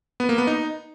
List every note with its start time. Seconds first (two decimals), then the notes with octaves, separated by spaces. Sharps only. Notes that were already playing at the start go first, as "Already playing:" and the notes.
0.20 B3
0.29 A#3
0.38 B3
0.47 D#4